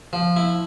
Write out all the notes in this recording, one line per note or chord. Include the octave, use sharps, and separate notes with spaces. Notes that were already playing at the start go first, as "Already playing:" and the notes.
F3
E4